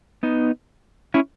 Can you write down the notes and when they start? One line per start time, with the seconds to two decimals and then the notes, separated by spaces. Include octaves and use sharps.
0.23 B3 D#4
1.14 C#4 E4